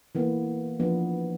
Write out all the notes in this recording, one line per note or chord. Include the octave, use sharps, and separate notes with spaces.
E3 A#3 B3
F3 B3 D4